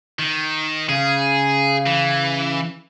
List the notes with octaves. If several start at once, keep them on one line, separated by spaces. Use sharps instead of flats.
D#3
C#3 G#4
E3